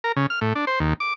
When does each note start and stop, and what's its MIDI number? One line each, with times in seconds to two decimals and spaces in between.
0.04 0.12 70
0.16 0.26 49
0.30 0.40 89
0.41 0.53 45
0.55 0.65 62
0.67 0.79 72
0.80 0.93 39
1.00 1.14 86